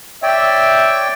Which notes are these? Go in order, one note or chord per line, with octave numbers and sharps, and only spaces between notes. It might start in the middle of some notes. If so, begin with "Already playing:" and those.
C#5 D5 E5 G5